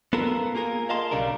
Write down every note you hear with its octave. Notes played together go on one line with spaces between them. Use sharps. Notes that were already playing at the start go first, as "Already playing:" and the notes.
B3 F4 A4 A#4
A#3 F4 G#4 A#4
A#4 D#5 F5 A5 C6
B1 C#3 G3 D4 A#4